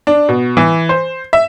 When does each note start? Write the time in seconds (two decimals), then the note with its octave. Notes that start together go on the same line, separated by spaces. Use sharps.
0.07 D4
0.29 B2
0.57 E3
0.89 C5
1.33 E5